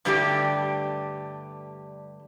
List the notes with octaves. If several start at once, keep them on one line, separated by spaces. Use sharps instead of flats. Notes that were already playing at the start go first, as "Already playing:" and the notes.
G2 D3 G3 A3 G4